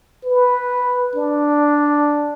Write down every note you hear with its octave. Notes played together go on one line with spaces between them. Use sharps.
B4
D4